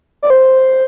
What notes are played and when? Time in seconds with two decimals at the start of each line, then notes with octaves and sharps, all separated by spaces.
0.23 D5
0.30 C5